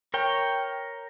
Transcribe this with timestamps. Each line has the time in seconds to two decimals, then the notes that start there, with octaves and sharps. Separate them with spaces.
0.14 A#4 C#5 G5